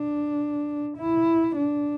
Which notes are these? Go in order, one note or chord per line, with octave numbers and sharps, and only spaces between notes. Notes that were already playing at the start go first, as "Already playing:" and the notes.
Already playing: D4
E4
D4